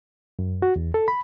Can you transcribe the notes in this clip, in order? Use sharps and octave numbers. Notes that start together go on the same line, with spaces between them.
F#2
F#4
E2
A4
B5